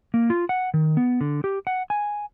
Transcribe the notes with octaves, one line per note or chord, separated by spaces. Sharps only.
A#3
F4
F#5
D#3
B3
D3
G4
F#5
G#5